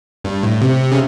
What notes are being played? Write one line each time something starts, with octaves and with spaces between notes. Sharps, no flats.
G2
A2
C3
C#3